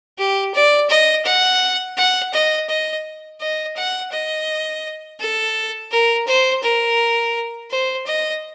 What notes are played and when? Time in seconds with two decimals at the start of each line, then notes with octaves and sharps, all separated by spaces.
0.18 G4
0.54 D5
0.89 D#5
1.25 F#5
1.97 F#5
2.34 D#5
2.69 D#5
3.41 D#5
3.77 F#5
4.12 D#5
5.20 A4
5.91 A#4
6.27 C5
6.63 A#4
7.70 C5
8.07 D#5